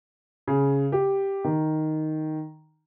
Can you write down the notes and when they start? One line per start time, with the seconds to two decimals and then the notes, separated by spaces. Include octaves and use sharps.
0.48 C#3
0.92 G4
1.44 D#3